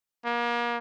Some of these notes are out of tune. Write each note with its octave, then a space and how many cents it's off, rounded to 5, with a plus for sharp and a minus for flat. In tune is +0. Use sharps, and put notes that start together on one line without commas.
A#3 +35